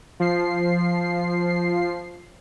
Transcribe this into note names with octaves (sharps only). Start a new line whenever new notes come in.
F3 C7